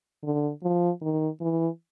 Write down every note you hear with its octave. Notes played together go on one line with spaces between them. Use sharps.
D3
F3
D#3
E3